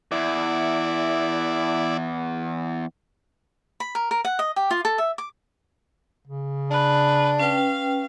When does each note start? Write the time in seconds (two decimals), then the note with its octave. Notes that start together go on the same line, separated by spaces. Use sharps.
0.12 E2 E4 D5
3.80 B5
3.95 A#4
4.11 A#4
4.25 F#5
4.39 D#5
4.56 G4
4.71 F4
4.85 A4
4.98 E5
5.18 D6
6.27 C#3
6.71 D4 B4
7.40 C#4 B4 F5 G5